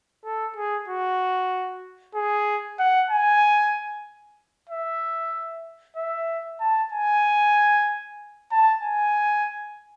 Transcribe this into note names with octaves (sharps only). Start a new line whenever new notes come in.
A4
G#4
F#4
G#4
F#5
G#5
E5
E5
A5
G#5
A5
G#5